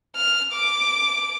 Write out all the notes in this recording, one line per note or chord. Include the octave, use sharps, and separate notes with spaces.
F6
D6